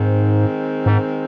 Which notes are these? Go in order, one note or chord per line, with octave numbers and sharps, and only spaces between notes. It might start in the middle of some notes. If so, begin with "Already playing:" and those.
Already playing: G#2 D#3 G#3 C4
G#2